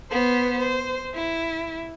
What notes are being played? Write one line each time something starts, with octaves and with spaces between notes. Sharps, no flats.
B3 C5
C5
E4